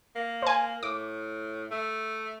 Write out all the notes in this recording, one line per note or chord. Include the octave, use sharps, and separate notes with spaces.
A#3
C5 G#5
A2 D6
A3